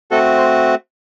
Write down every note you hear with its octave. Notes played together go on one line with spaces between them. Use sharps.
A3 C4 F#4 A4
C5